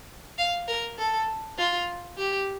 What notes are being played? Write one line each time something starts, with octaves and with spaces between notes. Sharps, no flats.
F5
A#4
A4
F4
G4